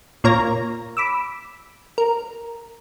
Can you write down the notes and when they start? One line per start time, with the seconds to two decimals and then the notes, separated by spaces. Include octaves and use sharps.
0.24 A#2 A#4 C#5 A#5 A#6
0.97 B5 D6 E6
1.98 A#4